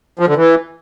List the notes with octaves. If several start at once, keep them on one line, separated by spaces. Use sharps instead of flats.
F3
D3
E3